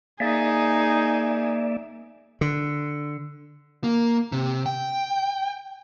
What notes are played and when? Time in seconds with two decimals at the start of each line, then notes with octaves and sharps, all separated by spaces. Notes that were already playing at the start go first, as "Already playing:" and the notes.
0.20 A#3 D#4 G#4 D5 E5
2.41 D3
3.84 A#3
4.32 C3
4.66 G5